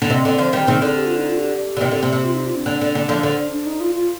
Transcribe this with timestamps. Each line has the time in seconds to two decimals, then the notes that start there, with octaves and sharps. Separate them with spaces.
0.02 D3
0.10 C3 D#5
0.21 D3 D#5
0.32 D5
0.38 D3 F3 C5
0.53 D#3 G3 A#4
0.67 C3 D#3 G#4
0.82 D3 G#4
0.96 G4
1.06 F4
1.17 D#4
1.28 F4
1.38 G4
1.77 D3
1.81 C3 D#3
1.91 D3
2.03 C3
2.13 C3
2.24 F4
2.34 D#4
2.45 F4
2.56 D4
2.66 D3
2.81 D3
2.95 D3
3.09 D3 F3
3.23 D3
3.52 D4
3.66 D#4
3.80 F4
3.95 F4